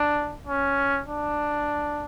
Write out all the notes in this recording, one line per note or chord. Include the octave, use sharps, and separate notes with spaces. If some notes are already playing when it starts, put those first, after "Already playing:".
Already playing: D4
C#4
D4